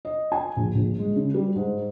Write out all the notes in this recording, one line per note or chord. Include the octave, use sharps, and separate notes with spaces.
D#5
G#5
A#1
A#1
G#3
C#3
G3
G#2